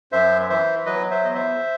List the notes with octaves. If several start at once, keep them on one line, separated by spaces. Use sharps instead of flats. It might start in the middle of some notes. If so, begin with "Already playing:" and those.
F#2 C5 E5
E3 C5 E5
F#3 B4 D#5
C5 E5
E2 D#5
C5 E5